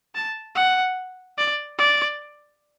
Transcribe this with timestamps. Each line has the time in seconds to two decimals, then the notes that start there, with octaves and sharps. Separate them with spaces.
0.15 A5
0.55 F#5
1.38 D5
1.79 D5